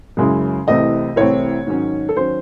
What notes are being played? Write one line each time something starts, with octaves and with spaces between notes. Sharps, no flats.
F#2 C#3 G#3 C#4 E4
C2 C3 E3 A3 C4 D#5
C2 C3 E3 A3 C4 C#5
G#2 D#3 F#3 C#4
A4
D#3 F#3 C#4 C5